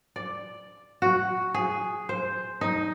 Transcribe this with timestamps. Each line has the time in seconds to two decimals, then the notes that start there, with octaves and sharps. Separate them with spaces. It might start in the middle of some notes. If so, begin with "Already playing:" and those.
0.16 D5
1.02 F#4
1.54 G#4
2.09 C5
2.61 D#4